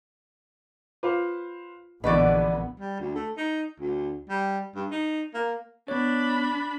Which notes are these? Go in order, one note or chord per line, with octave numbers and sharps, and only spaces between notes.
F4 B4 C5 F5
A#1 D3 E3 B3 B4 D5 D#5 C#6
G3
D2
A3
D#4
D2
G3
G2
D#4
A#3
B3 D4 C#5 B5